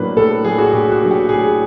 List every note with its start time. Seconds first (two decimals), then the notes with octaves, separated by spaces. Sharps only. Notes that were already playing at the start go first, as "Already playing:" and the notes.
Already playing: A2 F#3 A#3 D4 B4
0.16 A2 A4
0.45 F#3 A#3 D4 G#4
0.58 F#4
0.73 A2 G4
0.92 F#4
1.02 F#3 A#3 D4
1.11 G4
1.29 A2 G#4